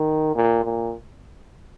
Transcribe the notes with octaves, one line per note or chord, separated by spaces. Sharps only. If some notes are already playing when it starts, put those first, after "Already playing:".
Already playing: D#3
A#2
A#2